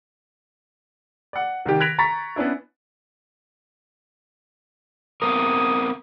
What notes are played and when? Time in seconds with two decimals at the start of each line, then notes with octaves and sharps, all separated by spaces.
1.33 D5 F#5
1.65 C2 D#3 G4
1.80 F#6 G#6 A#6 B6 D7 F7
1.99 A#5 C#6 A6 B6
2.36 B3 C#4 D4 E4
5.22 B3 C4 A#4 D#6